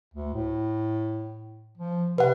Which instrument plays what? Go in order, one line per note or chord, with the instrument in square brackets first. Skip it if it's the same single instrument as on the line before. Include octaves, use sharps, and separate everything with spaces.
[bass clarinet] D2
A2
F3
[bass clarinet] C3 [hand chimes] B4 F#5